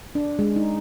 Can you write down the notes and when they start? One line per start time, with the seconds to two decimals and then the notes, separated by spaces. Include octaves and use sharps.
0.15 D4
0.39 G#3
0.56 D#4